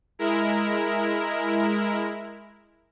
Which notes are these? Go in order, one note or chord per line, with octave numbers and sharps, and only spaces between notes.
G#3 E4 A#4